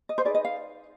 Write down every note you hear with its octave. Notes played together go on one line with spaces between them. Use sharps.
D#5
C5
D#4 G#4 B4 D5
D#5
F5